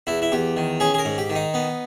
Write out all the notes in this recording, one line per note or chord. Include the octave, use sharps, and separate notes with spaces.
E2 E4
E4
E2 G4
D#3
C#4 G#4
G#4
A#4
G#2
G4
D#3
D#4
B3